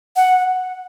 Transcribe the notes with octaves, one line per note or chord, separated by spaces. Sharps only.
F#5